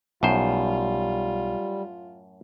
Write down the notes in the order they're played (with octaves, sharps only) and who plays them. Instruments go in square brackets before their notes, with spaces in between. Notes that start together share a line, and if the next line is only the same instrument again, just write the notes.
[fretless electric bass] B1 [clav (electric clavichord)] F#2 A2 C5 [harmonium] G3 [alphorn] F4